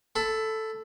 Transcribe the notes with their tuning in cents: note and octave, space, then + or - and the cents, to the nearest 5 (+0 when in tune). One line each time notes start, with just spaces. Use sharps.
A4 +0 B5 +25